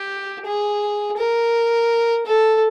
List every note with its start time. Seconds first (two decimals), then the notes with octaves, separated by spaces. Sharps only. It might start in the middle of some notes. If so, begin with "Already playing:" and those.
Already playing: G4
0.45 G#4
1.17 A#4
2.26 A4